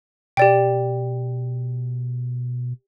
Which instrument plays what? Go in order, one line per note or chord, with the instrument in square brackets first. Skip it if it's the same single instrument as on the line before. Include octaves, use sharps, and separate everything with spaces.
[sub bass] B2 [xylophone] G4 D5 G5